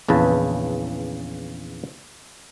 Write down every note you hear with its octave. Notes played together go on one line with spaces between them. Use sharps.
A#1 E2 C#3 B4 A5